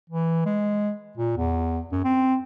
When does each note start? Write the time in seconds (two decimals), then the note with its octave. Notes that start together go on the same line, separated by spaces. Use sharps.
0.10 E3
0.45 G#3
1.17 A#2
1.37 E2
1.92 F#2
2.04 C4